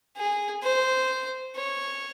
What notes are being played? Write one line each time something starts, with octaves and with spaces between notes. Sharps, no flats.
G#4
C5
C#5